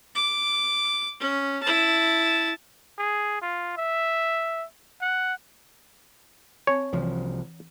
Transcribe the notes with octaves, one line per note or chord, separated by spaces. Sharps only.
D6
C#4
E4 A5
G#4
F4
E5
F#5
C4 C#5 G#5
C2 E3 F3